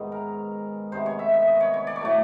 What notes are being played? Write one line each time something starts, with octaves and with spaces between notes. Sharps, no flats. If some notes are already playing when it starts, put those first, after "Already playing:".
Already playing: G#2 D#3 G#3 B3
A#4
C3 D#3 G#3 B3 C5
C#5
E5
E5
D#5
C#5
C#5
D5
C#5
A2 F#3 A3 D5